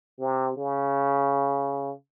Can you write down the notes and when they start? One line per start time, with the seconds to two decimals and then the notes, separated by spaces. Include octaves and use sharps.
0.19 C3
0.57 C#3